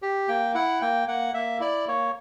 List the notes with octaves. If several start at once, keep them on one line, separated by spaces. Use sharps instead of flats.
G4
A#3 G5
E4 F#5
A#3 G5
A#3 F#5
A#3 E5
E4 D5
A#3 C#5